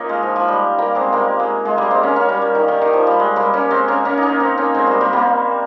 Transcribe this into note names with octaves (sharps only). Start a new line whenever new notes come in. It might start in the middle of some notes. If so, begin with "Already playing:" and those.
Already playing: A#3 C#4 D#4 F4
G#3
F3
F3
G3
G3 A#3
G#3 C4
G3 A#3
G#3
G#3
G3 A#3
G#3 C4
A#3 C#4
A#3 C#4
G3
G3
D#3
D#3
D#3
F3
G3
G#3
G3 A#3
A#3 C#4
G#3 C4
A#3 C#4
A#3 C#4
D#4
A#3 C#4
C4 D#4
A#3 C#4
G#3 C4
G3 A#3
G3 A#3
G3 A#3